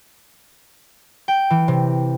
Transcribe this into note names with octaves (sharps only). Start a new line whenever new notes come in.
G5
E3
C3